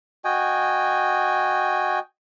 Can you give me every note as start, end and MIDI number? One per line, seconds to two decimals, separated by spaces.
0.25 1.99 66
0.25 1.99 75
0.25 1.99 79
0.25 1.99 80